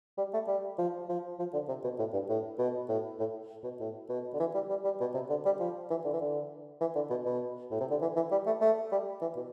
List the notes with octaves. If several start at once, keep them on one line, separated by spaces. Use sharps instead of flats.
G3
A3
G3
F3
F3
F3
D3
C3
B2
A2
G2
A2
B2
A2
A2
B2
A2
B2
D3
E3
G3
G3
G3
B2
C3
D3
G3
F3
E3
D3
E3
D3
E3
D3
B2
B2
A2
C3
D3
E3
E3
G3
A3
A3
G3
E3
B2